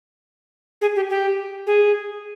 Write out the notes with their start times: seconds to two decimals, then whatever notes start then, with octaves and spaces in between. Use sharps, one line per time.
0.81 G#4
0.96 G4
1.10 G4
1.67 G#4